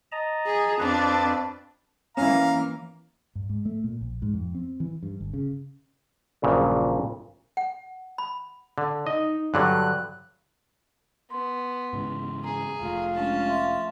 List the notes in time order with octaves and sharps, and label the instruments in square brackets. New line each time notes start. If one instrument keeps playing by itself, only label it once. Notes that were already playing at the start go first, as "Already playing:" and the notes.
[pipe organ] D#5 A5 A#5
[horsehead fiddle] G#4
[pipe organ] F2 B4 [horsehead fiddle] C4 D4
[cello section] E3 A#3 [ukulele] C#4 E4 [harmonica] F5 A#5
[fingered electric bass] G2
G#2
A3
A#2
A#1
G#2
F2
C4
E3
G2
G1
C#3
[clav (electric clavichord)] A#1 G2 A#2 C#3 F#3
[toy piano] F#5
B5
[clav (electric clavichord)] D3
[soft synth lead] D#4 [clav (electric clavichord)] D#5
[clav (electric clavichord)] G2 D3 F#3 [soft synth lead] F#6
[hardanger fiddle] B3 [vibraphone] C6
[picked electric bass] G#2 C#3 E3
[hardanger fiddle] G#4 [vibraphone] A#5
[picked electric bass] F1 A3 [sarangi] F4
[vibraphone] G#3 D4 [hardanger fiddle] C#4 A5
[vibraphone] E5 F5 C6